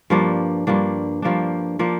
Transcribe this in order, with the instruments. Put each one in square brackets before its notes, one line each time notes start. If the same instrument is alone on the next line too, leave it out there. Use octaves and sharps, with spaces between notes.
[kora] G2 F3 A#3 D4
G2 F3 A#3 D4
G2 F3 A#3 D4
F3 A#3 D4